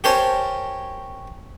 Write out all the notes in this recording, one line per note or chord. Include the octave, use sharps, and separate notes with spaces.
G4 A#4 C5 C#5 G#5 A5